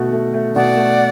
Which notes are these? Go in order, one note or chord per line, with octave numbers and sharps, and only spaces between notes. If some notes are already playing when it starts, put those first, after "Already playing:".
Already playing: B2 A3 F#4
A3
A3
B2 D5 F#5
A3